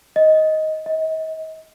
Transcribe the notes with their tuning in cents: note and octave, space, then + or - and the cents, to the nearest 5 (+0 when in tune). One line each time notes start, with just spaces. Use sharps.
D#5 +10
D#5 +40